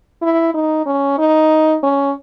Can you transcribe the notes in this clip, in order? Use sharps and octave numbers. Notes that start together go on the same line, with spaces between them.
E4
D#4
C#4
D#4
C#4